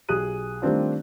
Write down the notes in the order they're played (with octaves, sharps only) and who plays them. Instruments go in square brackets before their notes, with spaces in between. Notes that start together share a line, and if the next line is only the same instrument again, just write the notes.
[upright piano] B1 G4 G#4 D#6 F#6 D#7
D#3 G3 A3 C4 D4 F4